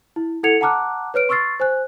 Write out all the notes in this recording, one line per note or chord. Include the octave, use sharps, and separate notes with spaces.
E4
E4 A4 F#5 G#6 C#7 F7
F#5 A5 A#5 D6 F6 F#6
B4 C#5 F6 D7
C6 C#6 E6 F6 A6 C7
C5 G#5 F#6